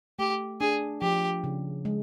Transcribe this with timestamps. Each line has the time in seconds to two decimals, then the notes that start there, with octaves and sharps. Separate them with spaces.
0.19 A3 G4
0.61 D4 G#4
1.02 F3 G4
1.44 C#3
1.85 G#3